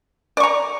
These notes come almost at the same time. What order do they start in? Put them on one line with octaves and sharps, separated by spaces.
D5 C#6 A#5